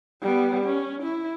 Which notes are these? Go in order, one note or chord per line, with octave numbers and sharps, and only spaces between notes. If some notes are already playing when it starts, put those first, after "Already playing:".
G3 B3
C#4
E4